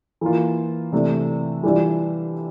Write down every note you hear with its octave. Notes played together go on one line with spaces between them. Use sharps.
E3 A#3 F4
C3 E3 A3 D4
E3 G3 D4 F4